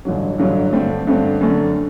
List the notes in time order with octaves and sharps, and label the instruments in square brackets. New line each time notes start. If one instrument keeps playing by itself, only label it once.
[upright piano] A1 G2 D3 F#3
A1 G2 D3 F#3
G2 D3 A3 C4
G2 D3 A3 C4
F#2 D3 A3